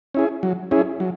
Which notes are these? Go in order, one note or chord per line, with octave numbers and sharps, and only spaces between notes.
C#4 E4 G#4
F#3
C#4 E4 G#4
F#3